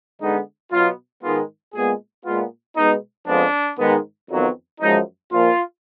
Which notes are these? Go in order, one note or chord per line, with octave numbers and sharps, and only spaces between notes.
D3 G#3 B3 D#4
B2 F#3 B3 F4
G#2 D#3 G#3 B3 F4
A#2 G#3 B3 G#4
A#2 G#3 B3 F4
B2 G#3 B3 D#4
F2 F3 G#3 B3 D4
G#2 D#3 G#3 B3
F2 D#3 F#3 B3
F#2 F3 G#3 D#4
A#2 F3 A#3 F4